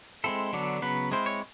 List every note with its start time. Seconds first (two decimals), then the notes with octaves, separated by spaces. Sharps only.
0.24 G#3 C4 E4 A4
0.53 D3 F#3 B3 D4
0.82 C#3 F#3 B3 B4
1.12 G#3 C4 E4 C5
1.26 C#5